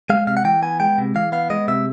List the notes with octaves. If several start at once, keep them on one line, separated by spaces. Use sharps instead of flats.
G#3 F5
C3 F5
F#5
E3 G5
B3 G#5
G#3 G5
C3
E3 F5
B3 F5
G#3 D#5
C3 E5